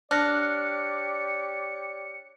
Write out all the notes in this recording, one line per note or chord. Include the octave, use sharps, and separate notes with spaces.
D4 G4 C#5 D5 F6 F#6 A#6 C#7